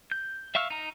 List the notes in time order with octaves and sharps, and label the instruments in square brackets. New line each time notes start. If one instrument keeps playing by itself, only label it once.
[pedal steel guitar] G6
E5 F5 C#6 E6 F6
D#4 A#5